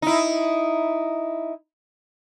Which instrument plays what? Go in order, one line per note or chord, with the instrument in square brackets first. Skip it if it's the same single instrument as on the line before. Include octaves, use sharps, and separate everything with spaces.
[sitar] D#4 E4